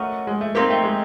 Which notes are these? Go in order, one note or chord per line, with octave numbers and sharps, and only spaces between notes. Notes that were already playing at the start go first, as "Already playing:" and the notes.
Already playing: A3 C#4 F#4 A#4 D#5
G#3
A3
A#3 C4 D#4 G4
A3
G#3